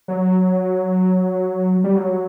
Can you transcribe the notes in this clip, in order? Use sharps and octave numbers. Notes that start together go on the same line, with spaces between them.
F#3
G3
F#3